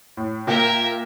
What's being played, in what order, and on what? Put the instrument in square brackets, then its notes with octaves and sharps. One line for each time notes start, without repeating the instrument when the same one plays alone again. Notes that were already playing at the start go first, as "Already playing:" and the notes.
[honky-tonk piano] A2
[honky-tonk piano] A#2 A#3 G5 [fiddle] A#4 E5